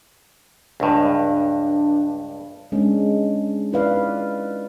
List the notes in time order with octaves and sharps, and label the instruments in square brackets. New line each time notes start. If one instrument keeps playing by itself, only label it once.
[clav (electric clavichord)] C#2 G2 [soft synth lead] D4
[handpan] G#3 C#4 D4
D#4 E4 B4 D5 F5